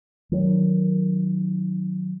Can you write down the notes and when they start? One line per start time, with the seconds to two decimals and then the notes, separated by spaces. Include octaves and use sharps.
0.32 D#3 F#3